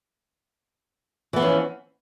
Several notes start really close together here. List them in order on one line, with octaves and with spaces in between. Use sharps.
E3 B3 F3 C#4